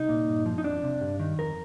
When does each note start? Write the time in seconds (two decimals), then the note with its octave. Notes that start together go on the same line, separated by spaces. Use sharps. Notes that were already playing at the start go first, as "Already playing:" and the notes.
Already playing: C2 D#4
0.09 A#2
0.28 G2
0.46 F3
0.58 D#4
0.64 F2 D4
0.83 C3
1.01 G2
1.19 D#3
1.38 F2 A#4